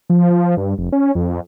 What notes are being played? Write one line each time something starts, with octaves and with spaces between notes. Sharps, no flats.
F3
F3
G2
F1
C#4
F2